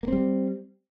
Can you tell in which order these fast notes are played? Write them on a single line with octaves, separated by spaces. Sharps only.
A#3 C4 G3